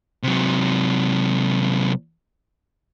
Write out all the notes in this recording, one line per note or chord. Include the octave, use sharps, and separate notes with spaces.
C3 F#3